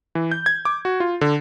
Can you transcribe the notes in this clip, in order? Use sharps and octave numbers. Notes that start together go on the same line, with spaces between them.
E3
G6
G#6
D6
F#4
F4
D3